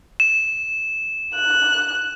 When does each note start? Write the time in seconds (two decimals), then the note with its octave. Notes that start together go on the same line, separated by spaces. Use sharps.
0.20 E7
1.35 F#6